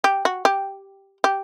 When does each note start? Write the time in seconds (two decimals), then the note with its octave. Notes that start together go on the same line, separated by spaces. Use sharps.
0.04 G4
0.25 F#4
0.45 G4
1.24 G4